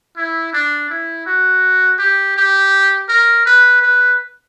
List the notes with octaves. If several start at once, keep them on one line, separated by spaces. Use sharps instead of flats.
E4
D4
E4
F#4
G4
G4
A#4
B4
B4